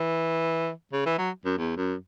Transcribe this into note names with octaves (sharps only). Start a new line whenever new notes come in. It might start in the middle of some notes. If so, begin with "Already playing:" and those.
Already playing: E3
C#3
E3
F#3
F#2
E2
F#2